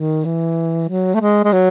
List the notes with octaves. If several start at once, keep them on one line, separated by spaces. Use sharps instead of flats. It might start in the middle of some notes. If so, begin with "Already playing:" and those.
Already playing: D#3
E3
F#3
A3
G#3
G#3
F#3